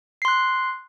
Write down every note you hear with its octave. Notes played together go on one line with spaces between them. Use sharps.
C6 F#6 C7